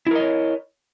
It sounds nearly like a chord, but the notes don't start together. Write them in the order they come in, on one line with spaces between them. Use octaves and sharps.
E4 A#4 D#5 C#5